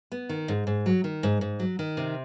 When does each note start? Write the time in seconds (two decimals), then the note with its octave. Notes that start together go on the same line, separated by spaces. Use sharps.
0.12 B3
0.29 D#3
0.48 G#2
0.67 G#2
0.86 F#3
1.04 D#3
1.23 G#2
1.41 G#2
1.60 F#3
1.79 D#3
1.97 C3